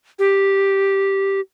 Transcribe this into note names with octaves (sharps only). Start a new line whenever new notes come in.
G4